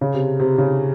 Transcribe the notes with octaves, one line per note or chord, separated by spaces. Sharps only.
C#3
C3
C3
C#3